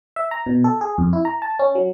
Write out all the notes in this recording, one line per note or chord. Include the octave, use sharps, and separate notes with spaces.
E5
A#5
B2
A4
G#4
F2
E4
A#5
A5
C#4
F#3